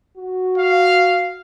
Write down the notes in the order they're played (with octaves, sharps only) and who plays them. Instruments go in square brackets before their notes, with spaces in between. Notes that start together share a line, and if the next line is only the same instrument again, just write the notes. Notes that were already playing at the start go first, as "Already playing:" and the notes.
[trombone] F#4
[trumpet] F5